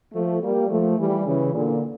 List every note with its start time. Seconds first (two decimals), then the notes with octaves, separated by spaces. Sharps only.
0.13 F3 A3
0.42 G3 A#3
0.70 F3 A3
0.98 E3 G3
1.26 C#3 E3
1.54 A#2 D3